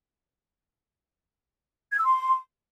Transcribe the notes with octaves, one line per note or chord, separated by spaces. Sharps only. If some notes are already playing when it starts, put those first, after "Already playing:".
G#6
E6
C6